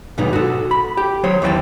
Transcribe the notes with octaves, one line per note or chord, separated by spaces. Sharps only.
D#2 G#2 B2 F#3 B3 D#4
F#4 A4
B5
G4
F#3 C5 C#5
D#2 E3 C5 G5 A5